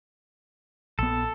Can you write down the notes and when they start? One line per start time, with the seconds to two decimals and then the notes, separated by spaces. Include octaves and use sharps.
0.99 A#1 B3 A4